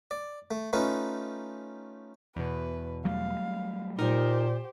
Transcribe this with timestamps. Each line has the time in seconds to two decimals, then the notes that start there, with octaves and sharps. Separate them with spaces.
0.11 D5
0.51 A3
0.73 A3 C#4 D#4 F4 B4
2.36 E2 B2 B4
3.05 F#3 G3 A3 F5
3.98 A#2 D#4 G4 A#4 C5